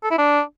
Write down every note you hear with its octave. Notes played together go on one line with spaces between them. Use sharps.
A4
E4
D4